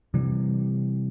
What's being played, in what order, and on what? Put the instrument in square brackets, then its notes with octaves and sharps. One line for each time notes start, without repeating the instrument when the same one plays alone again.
[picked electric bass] C3 E3 G3